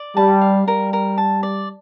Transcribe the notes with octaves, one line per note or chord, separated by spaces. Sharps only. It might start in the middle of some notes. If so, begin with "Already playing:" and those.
Already playing: D5
G3 A5
F5
G3 A#4
A#4
A5
D5